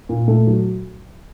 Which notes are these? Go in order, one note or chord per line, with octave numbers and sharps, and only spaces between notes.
A#2
A3
F#3